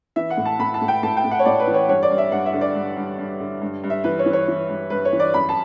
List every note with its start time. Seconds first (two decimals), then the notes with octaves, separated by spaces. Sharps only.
0.16 E3 E5
0.30 F#5
0.37 A2
0.45 A5
0.59 A2 B5
0.74 A5
0.81 A2
0.88 G5
1.03 A2 A5
1.17 G5
1.24 A2
1.31 F#5
1.39 C#5
1.45 A2 D5
1.60 B4
1.67 E3
1.74 C#5
1.88 G2 C#5
2.03 D5
2.10 G2
2.18 E5
2.31 G2 F#5
2.46 E5
2.53 D3
2.61 D5
2.75 G2
2.96 G2
3.18 G2
3.40 D3
3.62 G2
3.84 G2
3.90 E5
4.04 E3 B4
4.19 C#5
4.26 E3
4.33 C#5
4.48 E3
4.69 G2
4.90 G2 B4
5.05 C#5
5.13 E3
5.20 D5
5.34 F#2 B5
5.49 A5